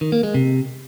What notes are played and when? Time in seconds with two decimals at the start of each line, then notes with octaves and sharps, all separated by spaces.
0.01 D#3
0.12 A#3
0.23 G#3
0.34 C3